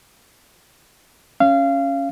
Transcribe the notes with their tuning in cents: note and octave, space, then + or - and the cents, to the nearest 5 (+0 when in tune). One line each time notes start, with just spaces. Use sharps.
C#4 +0 F5 -25